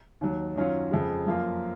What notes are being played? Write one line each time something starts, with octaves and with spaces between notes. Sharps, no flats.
D#2 D#3 F#3
F#2 D#3 F#3 C#4 F4
F2 C#3 G#3
F#2 F3 A#3 F4